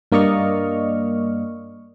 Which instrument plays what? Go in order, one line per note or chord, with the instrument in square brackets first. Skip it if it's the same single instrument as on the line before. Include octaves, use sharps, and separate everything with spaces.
[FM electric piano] G2 A#3 D5 D#5 C#6 F6